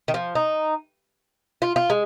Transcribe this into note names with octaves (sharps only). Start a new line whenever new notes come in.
D#3
F3
D#4
F4
F4
G#3